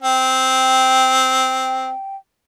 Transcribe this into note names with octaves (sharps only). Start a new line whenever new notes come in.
C4 G5